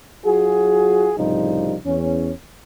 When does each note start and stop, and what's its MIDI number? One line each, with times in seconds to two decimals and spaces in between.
0.25 1.12 54
0.25 1.12 65
0.25 1.12 66
0.25 1.12 68
1.17 1.76 36
1.17 1.76 45
1.17 1.76 49
1.17 1.76 53
1.17 1.76 55
1.17 1.76 63
1.85 2.32 40
1.85 2.32 61